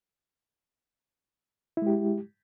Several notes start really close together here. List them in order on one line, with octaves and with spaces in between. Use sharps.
E4 G#3 G4